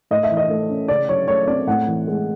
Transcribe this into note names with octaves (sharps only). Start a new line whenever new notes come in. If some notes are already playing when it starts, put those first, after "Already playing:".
A2 D#5
E5
E3
D#5
A3
C#4
C#3 D5
F#3 C#5
A3 C#5
C4 D5
A2 F#5
E3
G#3